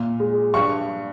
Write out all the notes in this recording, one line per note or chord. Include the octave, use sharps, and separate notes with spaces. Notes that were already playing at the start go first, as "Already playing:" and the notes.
Already playing: A#2
G#3
G2 C#6